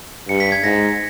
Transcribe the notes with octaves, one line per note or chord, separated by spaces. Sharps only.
G2 C#7
B6
G#6
G#2 A#6